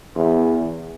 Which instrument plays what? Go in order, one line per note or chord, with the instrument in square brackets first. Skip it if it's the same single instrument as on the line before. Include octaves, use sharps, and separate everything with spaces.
[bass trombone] E2